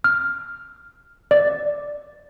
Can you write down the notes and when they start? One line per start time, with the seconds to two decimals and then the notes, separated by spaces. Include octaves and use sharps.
0.04 F6
1.31 D5